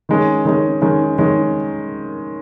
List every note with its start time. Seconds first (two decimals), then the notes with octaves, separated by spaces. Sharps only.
0.09 D#3 G#3 C#4
0.45 D#3 G#3 C#4
0.82 D#3 G#3 C#4
1.18 D#3 G#3 C#4